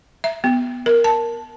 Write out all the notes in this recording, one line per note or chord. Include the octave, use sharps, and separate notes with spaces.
E5
B3
A#4
A5